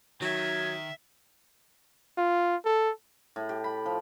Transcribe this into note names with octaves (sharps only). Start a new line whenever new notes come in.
D#3 F#3 E5 G#5
F4
A4
A2
G4
B5
F3